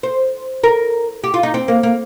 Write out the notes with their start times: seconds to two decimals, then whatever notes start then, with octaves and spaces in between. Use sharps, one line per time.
0.03 C5
0.63 A#4
1.24 G4
1.34 F4
1.43 D#4
1.54 C4
1.68 A#3
1.83 A#3